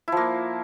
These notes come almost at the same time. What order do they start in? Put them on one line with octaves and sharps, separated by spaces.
E4 F3 A#3